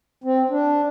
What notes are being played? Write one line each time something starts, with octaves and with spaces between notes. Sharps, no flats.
C4
D4